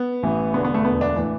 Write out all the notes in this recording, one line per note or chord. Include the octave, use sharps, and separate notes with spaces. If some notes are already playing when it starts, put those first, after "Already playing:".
Already playing: B3
A1 A2 E3
E1 E2 D3 B3
B3
A3
E1 D2 D3 B3
D4
A2 E3